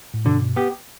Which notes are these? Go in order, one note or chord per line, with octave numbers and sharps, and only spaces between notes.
A2
G2 B2 D3
B3 G4